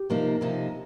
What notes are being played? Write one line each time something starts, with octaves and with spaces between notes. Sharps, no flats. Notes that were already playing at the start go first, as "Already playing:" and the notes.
Already playing: G4
C3 F3 A#3 D#4
C3 F3 A#3 D#4